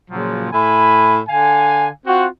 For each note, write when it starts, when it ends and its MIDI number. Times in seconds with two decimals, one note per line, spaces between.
0.10 0.49 46
0.10 0.49 49
0.10 0.49 53
0.10 0.49 54
0.52 1.20 45
0.52 1.20 64
0.52 1.20 80
0.52 1.20 83
1.28 1.88 50
1.28 1.88 77
1.28 1.88 80
2.06 2.26 60
2.06 2.26 65
2.06 2.26 66